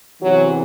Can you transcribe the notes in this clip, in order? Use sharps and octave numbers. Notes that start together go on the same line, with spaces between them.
E2 C3 E3 F#3